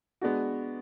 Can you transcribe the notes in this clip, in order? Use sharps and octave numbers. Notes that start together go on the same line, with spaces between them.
G#3 B3 D4 F#4